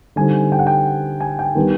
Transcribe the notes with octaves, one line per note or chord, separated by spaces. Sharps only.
D3 G3 C4 D#4 G#5
G5
F#5
G5
G#5
G5
D#3 G3 B3 D4